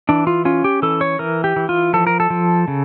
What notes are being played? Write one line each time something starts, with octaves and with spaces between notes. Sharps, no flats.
E3 D4
F4
C#4 F4
G4
E3 A4
C#5
E3 A#4
G4
E3
F4
F3 A4
A#4
A4
F3
C#3